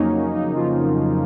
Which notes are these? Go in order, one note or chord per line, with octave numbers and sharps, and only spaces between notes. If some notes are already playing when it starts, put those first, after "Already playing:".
Already playing: F2 C#3 F#3 A#3 C#4 D#4
C#4
D#4
F3 F4